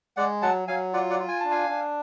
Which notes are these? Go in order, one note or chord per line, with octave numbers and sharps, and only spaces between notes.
G#3 D5 F#5
F#3 F#5 A5
F#3 F5 G#5
F4 D5 F#5
D5 F#5
F4
G#5
D4 A5
F5 G#5
D4